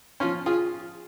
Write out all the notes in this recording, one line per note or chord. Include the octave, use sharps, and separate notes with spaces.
F3 C#4 F4
F4 G#4